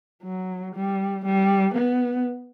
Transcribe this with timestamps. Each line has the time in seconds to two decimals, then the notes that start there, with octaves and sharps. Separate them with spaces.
0.23 F#3
0.75 G3
1.25 G3
1.75 B3